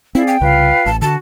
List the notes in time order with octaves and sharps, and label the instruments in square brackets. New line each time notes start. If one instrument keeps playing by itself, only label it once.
[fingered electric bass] C4 [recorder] E4 [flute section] G#4 D5 F5
[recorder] G5
[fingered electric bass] C2 C#3 [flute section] F4 B4 F5
[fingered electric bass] A1 [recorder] A5
[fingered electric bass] D3 [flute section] F#4 [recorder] A5